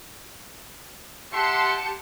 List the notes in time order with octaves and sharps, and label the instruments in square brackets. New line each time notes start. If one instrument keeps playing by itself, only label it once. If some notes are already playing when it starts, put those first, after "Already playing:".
[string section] G4 A5 C#7 [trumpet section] E5 F#5 C6